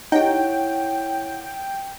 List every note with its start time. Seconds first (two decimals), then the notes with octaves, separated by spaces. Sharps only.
0.12 D#4 E4 G4 C#5 F#5 G5